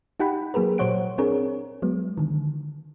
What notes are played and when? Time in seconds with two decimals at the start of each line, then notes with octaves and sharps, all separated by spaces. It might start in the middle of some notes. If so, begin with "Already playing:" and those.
0.20 D#4 G4 F#5 G5 B5
0.54 F#3 A#3 G#4 A#4 B4
0.78 A#2 F#3 C5 C#5 F#5 D7
1.18 C4 D4 G#4 A#4 C#5
1.82 F#3 G#3 B3
2.18 D3 D#3